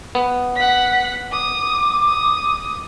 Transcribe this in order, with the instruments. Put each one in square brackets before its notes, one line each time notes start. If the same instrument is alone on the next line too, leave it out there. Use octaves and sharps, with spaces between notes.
[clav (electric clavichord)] B3
[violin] F#5 B6
[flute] D6 [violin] D#6
[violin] D#6